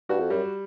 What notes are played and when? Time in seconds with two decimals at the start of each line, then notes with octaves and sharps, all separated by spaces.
0.09 G2 F#4
0.20 F2
0.30 F#2 G3